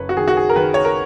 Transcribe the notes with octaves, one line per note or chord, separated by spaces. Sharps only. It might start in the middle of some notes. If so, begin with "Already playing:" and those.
Already playing: F#1 A#3 B4 C#5
F#4
D#3 G#4
F#4
G#4
A#4
D#3 B4
C#5
A#4